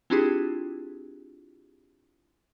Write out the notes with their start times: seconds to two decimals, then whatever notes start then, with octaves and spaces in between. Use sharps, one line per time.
0.10 C4 D4 E4 F4 G4 G#4